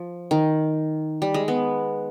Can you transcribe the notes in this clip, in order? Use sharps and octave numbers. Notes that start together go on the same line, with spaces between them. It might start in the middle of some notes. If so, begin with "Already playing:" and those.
Already playing: F3
D#3
G3
G#3
B3